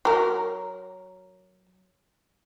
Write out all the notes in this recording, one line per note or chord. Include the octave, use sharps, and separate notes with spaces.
F#3 A#4